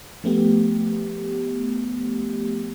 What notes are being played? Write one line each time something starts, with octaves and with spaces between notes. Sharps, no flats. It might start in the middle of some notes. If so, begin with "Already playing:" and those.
F3 A3 B3 G4